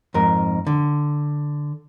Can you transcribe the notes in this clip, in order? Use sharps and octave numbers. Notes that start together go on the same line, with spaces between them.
F2 G#2 A#4
D3